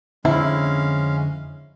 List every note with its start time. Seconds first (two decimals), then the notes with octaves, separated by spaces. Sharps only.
0.25 F2 D3 G#3 C4 C#4 E4 F5